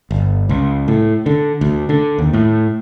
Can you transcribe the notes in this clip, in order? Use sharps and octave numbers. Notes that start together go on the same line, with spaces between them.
G1
C#2
A2
D3
D2
D3
D#2
A2